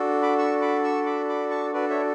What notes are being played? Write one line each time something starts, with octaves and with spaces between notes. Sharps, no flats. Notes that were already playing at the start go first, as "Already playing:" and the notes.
Already playing: D4 F#4 A4
B5 D6
C#6 E6
B5 D6
C#6 E6
B5 D6
B5 D6
A5 C#6
D4 F#4 A4 B4 D5
C#5 E5